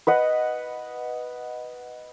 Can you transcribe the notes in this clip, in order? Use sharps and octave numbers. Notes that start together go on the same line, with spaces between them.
B4 D#5 F#5